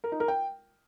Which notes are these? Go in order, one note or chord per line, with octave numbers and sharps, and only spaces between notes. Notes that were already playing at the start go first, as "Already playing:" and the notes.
A#4
D#4
A#4
G5